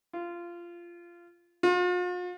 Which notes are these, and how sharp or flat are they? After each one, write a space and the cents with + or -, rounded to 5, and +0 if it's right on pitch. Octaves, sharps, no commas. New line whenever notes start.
F4 -15
F4 +45